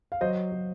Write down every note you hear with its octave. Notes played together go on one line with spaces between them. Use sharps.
F5
F#3 C5 D#5
F#3